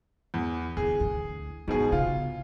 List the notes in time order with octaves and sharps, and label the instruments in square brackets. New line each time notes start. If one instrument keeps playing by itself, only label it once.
[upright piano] E2
[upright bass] D2 [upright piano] G#4
[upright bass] D2 E3
[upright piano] G#2 B2 G#4 [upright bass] E3
[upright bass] C#3 D#4 [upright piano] F4